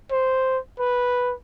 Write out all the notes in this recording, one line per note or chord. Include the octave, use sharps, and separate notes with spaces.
C5
B4